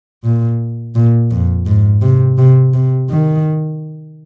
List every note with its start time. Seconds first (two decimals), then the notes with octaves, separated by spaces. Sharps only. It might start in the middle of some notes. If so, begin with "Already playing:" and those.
0.24 A#2
0.95 A#2
1.31 F2
1.66 G#2
2.02 C3
2.38 C3
2.74 C3
3.10 D#3